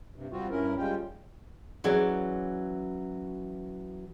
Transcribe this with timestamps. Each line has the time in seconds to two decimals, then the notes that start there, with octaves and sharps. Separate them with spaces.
0.16 G2 C3
0.32 G3 C4 F4 F#4
0.51 G2 C#4 E4 A#4
0.78 G3 G#3 C#4 F4 G5
1.84 E3 F#3 C#4 G#4 D5